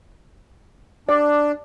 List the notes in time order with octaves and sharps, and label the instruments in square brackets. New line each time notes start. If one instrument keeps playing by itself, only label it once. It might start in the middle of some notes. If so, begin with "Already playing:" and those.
[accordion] D4 [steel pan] D5